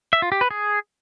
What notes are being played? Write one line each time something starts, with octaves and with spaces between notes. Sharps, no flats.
E5
F4
G4
B4
G#4